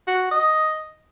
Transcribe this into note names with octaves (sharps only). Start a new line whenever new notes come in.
F#4
D#5